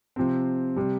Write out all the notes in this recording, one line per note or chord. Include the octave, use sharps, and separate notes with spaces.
C3 F3 C4
C3 G3